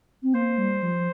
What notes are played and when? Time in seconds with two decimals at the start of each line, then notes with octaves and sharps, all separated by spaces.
0.23 C4
0.34 A#3 C5
0.58 G3
0.83 F3